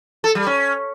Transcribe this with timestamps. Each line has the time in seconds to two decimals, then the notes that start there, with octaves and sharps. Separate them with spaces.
0.24 A4
0.35 G3
0.47 C#4